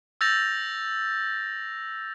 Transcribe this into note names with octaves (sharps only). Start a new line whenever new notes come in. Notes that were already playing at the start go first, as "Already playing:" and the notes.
E6 G6 A6 A#6 F7